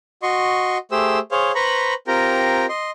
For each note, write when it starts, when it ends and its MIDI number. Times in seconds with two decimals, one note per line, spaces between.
0.23 0.78 66
0.23 0.78 75
0.23 0.78 84
0.23 0.78 85
0.92 1.19 57
0.92 1.19 67
0.92 1.19 68
0.92 1.19 72
0.92 1.19 88
1.31 1.52 68
1.31 1.52 72
1.31 1.52 73
1.31 1.52 77
1.55 1.94 71
1.55 1.94 72
1.55 1.94 82
1.55 1.94 83
1.55 1.94 85
2.07 2.66 60
2.07 2.66 65
2.07 2.66 67
2.07 2.66 70
2.07 2.66 79
2.07 2.66 82
2.69 2.91 75
2.69 2.91 84